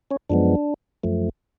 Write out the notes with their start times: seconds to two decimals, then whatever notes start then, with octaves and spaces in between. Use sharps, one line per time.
0.11 C#4 C#5
0.30 F#2 F3 G#3 B3 D4
1.03 F#2 F3 A3